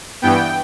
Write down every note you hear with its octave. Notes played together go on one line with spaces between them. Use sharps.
G2 E3 B3 G5